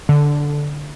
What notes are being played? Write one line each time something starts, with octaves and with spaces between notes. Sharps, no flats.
D3